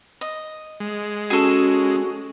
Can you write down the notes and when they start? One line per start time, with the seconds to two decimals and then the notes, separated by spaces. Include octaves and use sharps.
0.21 D#5
0.80 G#3
1.30 C#4 F#4 G#4 A4